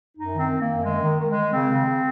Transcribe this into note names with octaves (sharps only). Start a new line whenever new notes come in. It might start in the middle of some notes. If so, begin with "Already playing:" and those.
F#2 D#4
D#3
C4
D#3
A#3
F#2
D#3 G#3
D#3
D#3
G#3
D#3
C#3 C4
C#3
C#3